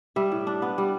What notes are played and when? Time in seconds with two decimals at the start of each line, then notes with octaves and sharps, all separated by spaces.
0.16 G3 E5
0.32 A2
0.47 D4
0.62 B3
0.78 G3